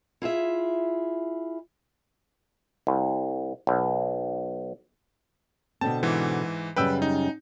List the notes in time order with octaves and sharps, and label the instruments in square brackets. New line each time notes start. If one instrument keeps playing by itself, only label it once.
[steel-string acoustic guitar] E4 F4 G#4 E5
[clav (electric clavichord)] C2
B1
[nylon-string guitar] B2 D3 C4 [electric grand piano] A5
[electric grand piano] G#2 E3
[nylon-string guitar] F#2 C#3 G3 [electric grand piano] B4 G5 E6
[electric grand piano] D#4